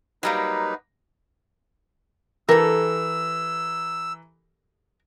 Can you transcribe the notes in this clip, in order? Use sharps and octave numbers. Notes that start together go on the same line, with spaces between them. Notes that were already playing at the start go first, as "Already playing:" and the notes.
F#3 G3 A#3 D#4 B4
E3 G4 A4 A#4 A#5 E6